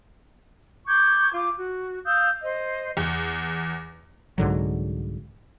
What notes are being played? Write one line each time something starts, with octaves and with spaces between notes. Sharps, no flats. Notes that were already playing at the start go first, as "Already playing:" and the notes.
C#6 D6 G6 G#6
F4 D6
F#4
F5 D#6 E6 G6
C5 D#5
E2
C2 G#2 D3 F#3